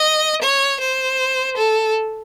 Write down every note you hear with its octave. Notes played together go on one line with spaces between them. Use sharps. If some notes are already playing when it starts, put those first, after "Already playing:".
Already playing: D#5
C#5
C5
A4